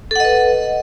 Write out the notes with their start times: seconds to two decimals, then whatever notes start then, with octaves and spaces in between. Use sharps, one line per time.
0.11 A4
0.16 F#5
0.20 D#5
0.25 B4